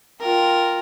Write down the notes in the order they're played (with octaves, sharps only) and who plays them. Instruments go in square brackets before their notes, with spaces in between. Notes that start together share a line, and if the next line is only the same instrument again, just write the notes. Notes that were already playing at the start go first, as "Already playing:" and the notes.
[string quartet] F4 A#4 G5